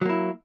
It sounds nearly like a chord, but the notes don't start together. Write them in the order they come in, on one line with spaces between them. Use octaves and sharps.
F#3 A#3 E4